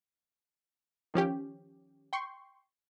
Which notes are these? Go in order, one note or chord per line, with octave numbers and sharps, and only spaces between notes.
D#3 F3 C#4 G4
G5 C6 C#6